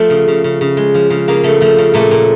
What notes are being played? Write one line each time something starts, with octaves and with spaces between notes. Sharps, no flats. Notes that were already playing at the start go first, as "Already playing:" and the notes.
Already playing: F3 A3
C#3
C#3
C#3
C#3
G#3
F3
C#3
C#3 A#3
C#3 A3
F3 A3
C#3
A#2 A3
A#2